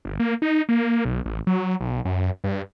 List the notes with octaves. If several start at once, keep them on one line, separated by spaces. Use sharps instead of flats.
G1
A#3
D#4
A#3
B1
A1
F#3
B1
F#2
G2